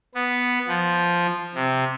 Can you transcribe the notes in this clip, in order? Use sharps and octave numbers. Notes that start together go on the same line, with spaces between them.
B3
F3
C3